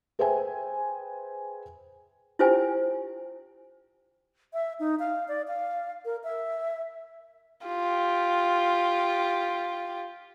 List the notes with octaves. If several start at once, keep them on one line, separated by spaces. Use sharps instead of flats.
G#4 B4 C5 E5 G5 G#5
E4 F4 G4 C5 G5 G#5
E5
D#4
F5
D5
F5
A#4
E5
F4 G4